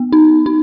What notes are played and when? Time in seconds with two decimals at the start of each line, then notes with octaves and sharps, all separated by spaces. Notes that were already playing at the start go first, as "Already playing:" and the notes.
Already playing: B3
0.12 D#4
0.46 D#4